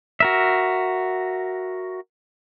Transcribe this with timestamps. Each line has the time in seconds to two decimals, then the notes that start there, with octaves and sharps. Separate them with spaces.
0.20 F#4 A#4 E5